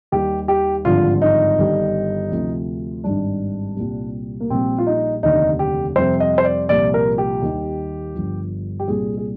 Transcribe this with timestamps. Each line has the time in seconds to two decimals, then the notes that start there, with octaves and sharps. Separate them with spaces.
0.12 D#2 D#3 G3 G4
0.48 G4
0.85 G#1 G2 D3 F3 F4
1.21 D#4
1.58 G1 G2 D#3 G3
2.31 D2 C3 F3
3.04 G#1 G2 D#3 G3 D4
3.77 C2 A#2 G3
4.40 A#3
4.50 A#1 A#2 G3 C4
4.78 F4
4.87 D#4
5.23 F1 D#2 D3 D#4
5.59 G4
5.96 F2 C3 G3 C5
6.20 D#5
6.38 C5
6.45 D5
6.69 C2 A#2 F3 D5
6.94 A#4
7.18 G4
7.42 D#2 D#3 G3
8.15 G1 G2 F3
8.80 G4
8.88 C2 A#2 G3 G#4
9.17 G#4